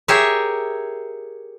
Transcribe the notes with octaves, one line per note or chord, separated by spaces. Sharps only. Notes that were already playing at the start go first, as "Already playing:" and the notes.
G4 G#4 A#4 C#5 E5